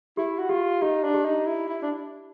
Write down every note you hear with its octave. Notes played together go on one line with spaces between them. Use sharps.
E4 G4
F#4
F4 G4
D#4 G4
D4
G4
D#4
E4
E4
D4